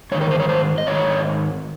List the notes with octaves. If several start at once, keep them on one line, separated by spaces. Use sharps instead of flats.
G#2 D#3 C#5
A#4
C5
C#5
C5
D#5
G#2 D#3 C#5